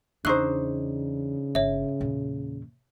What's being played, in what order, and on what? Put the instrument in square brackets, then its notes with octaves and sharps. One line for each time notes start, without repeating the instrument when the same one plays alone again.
[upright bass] E2 [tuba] C#3 [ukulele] D4 D#4 C5 [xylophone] C#6 E6 F#6
[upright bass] G1 [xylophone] C#5 E5
[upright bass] E2 A#2